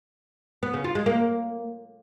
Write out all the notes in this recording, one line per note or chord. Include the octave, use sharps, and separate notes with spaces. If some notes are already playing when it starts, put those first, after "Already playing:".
B3
C#3
F4
G#3
A#3